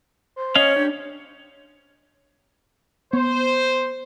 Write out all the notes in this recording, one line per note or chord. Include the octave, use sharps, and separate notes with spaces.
C5
C#4 C#5 D#5 F5
D4 G4
B3 C5